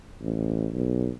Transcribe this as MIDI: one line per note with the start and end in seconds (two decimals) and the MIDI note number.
0.22 0.68 33
0.73 1.10 35